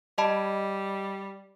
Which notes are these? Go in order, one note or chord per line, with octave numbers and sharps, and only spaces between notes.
G3 D#5 A5 B5